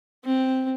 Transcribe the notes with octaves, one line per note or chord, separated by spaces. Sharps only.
C4